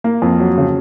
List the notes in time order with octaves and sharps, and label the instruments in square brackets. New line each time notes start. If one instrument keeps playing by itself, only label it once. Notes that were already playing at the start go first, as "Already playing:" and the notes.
[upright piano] A#3
F2
F#3
C#3